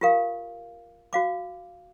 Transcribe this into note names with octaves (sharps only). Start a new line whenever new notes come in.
F4 G4 A#4 F5
F#4 F5 D6